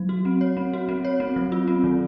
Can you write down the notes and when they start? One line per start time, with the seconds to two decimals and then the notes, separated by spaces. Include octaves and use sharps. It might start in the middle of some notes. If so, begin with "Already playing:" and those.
Already playing: F#3
0.09 F#4
0.25 C4
0.41 C#5
0.57 C4
0.73 F#4
0.89 C4
1.05 C#5
1.20 C4
1.36 F#3
1.52 F4
1.68 C4
1.84 D#3